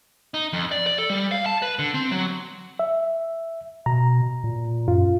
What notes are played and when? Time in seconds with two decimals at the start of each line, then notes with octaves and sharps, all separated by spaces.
0.34 D#4
0.53 F2
0.71 D5
0.87 D5
0.98 A4
1.10 G3
1.31 F5
1.46 A5
1.62 B4
1.79 D3
1.94 C4
2.12 F#3
2.79 E5
3.86 B2 A#5
4.44 A#2
4.88 F#2 F4